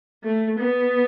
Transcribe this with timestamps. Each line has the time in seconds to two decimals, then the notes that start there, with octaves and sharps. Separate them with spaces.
0.23 A3
0.59 B3